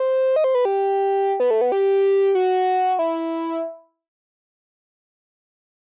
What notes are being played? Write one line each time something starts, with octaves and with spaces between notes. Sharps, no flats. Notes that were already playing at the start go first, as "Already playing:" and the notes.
Already playing: C5
D#5
C5
B4
G4
B3
A3
B3
G4
F#4
E4